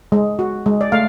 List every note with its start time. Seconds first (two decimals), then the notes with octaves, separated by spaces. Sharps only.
0.12 G#3
0.39 F#4
0.66 G#3
0.81 D5
0.92 A3 F5